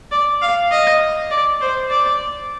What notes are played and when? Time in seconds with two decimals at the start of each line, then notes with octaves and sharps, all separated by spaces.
0.11 D5
0.42 F5
0.71 D#5
1.30 D5
1.61 C5
1.90 D5